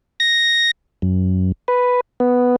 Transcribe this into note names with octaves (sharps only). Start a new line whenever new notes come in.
A#6
F#2
B4
B3